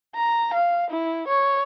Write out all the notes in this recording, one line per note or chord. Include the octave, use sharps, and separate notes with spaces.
A#5
F5
E4
C#5